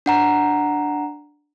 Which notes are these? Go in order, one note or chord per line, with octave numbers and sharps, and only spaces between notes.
D4 F#5 A#5